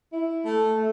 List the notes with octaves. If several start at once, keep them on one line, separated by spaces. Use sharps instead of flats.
E4
A3
A3